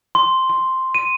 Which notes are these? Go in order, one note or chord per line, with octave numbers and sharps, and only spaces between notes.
C6
C6
D#7